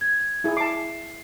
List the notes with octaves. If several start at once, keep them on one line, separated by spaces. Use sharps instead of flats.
G#6
E4 G#4
A5 D6 C7